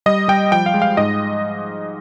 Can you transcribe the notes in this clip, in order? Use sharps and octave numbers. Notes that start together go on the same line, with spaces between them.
G3 D#5
G3 G5
F3 G5
F5
G#3
F5
G#2 D#5